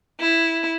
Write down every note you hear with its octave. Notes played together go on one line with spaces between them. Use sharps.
E4